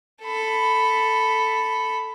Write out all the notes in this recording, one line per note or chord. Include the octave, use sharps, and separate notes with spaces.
A4 B5